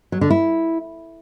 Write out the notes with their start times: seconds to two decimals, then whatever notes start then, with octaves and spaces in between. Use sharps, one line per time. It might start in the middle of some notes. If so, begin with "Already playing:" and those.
0.12 F#3
0.21 D3
0.30 E4